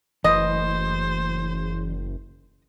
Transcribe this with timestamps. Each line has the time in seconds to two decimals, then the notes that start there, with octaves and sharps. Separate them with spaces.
0.24 F#1 E3 A3 B4 C5 D#5